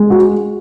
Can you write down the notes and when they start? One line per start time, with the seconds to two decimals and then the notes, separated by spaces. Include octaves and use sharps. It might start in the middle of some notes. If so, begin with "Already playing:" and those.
Already playing: G#3
0.10 F#4